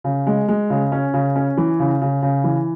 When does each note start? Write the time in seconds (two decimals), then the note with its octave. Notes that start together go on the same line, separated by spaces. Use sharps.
0.04 C#3
0.27 G#3
0.48 G#3
0.70 C#3
0.92 C#4
1.14 C#3
1.36 C#4
1.57 E3
1.80 C#3
2.01 C#3
2.22 C#3
2.44 E3